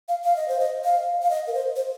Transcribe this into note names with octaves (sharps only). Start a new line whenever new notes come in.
F5
F5
D#5
C5
D#5
F5
F5
D#5
A#4
C5
C5